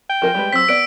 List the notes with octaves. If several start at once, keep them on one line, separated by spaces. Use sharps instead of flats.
G5
F3 A#4 G#5
G3 G#3 B4
F#3 C4 E6 B6
B3 D5 D7